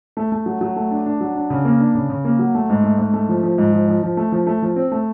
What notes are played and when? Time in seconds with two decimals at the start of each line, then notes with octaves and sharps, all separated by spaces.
0.17 A3
0.32 A3
0.46 F#3
0.61 F#3
0.76 A3
0.91 D4
1.06 D4
1.21 F#3
1.36 D4
1.50 C#3
1.65 A#3
1.80 D4
1.95 C#3
2.10 C#3
2.25 A#3
2.39 F#3
2.55 A3
2.70 G#2
2.84 A3
2.98 G#2
3.13 A3
3.29 F3
3.43 F3
3.58 G#2
3.73 F3
3.88 F3
4.03 F3
4.17 A3
4.32 F3
4.47 A3
4.62 F3
4.76 C4
4.92 A3